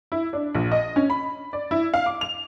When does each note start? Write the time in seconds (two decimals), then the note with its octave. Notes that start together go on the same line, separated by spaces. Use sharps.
0.12 E4
0.33 D4
0.55 A#1
0.72 D#5
0.96 C#4
1.10 B5
1.53 D5
1.71 E4
1.94 F5
2.06 D6
2.21 F7